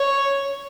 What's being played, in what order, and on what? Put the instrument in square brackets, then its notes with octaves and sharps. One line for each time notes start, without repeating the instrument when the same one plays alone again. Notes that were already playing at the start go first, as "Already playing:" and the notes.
Already playing: [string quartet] C#5